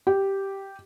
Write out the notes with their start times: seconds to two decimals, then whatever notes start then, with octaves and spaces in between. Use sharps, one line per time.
0.07 G4